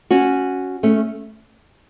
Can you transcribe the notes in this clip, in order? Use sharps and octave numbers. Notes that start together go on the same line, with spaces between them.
C#4 F#4
A3 C#4